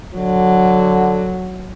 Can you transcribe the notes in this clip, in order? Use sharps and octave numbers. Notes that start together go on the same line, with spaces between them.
D3 F#3